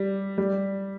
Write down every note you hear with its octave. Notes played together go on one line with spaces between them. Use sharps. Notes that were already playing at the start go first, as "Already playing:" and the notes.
Already playing: G3
G3